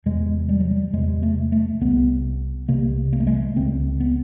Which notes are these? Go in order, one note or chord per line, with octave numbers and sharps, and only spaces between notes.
E2 C3 G#3
G3
F#3
G3
E2 C3 G#3
A3
A3
C2 C3 B3
C2 C3 A#3
A#3
A3
G#3
A3
C#2 C#3 C4
B3